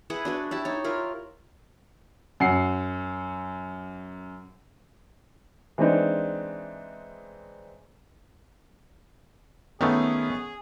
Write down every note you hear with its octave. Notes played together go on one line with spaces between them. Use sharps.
E4 G#4 B4 F#5
D4 F#4 B4
E4 G4 A5
D#4 C#5
E4 F4 A#4
F#2 F#5 C7
E3 G#3 C4 D4 D#4
D#3 A3 B3 C#4 G#4